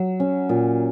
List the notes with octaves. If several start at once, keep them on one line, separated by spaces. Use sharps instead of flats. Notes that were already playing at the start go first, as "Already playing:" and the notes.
Already playing: F#3
C#4
A#2